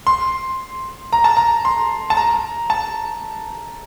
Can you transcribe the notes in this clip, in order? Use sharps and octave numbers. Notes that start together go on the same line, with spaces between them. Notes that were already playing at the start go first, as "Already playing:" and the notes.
C6
A#5
A5
A#5
C6
A5
A#5
A5